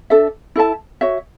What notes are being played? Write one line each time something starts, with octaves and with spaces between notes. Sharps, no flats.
D4 A4 E5
E4 A4 E5 A5
F#4 C#5 E5